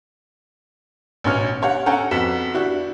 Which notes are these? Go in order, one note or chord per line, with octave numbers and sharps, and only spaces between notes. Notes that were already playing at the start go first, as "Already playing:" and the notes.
A1 B2 C#4 C#5 F6
G4 C#5 F5 F#5
C#4 A4 F#5 G5 A#5
F2 B3 F#4 B6 E7
D4 E4 F#4 G4